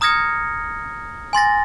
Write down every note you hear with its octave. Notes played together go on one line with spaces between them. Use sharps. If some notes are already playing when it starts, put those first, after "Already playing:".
A#5 D#6 F6 G#6 A#6 C#7
G#5 C6 A6 A#6